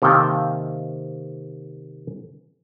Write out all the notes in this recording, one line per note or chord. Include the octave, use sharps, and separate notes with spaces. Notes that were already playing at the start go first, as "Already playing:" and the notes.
C3 D#3 A#3 F5 G5 A5